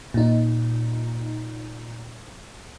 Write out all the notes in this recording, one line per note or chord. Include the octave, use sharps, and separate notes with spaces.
A#2 D#4